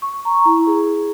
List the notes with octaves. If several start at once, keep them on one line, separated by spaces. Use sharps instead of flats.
C#6
A#5
E4
G#4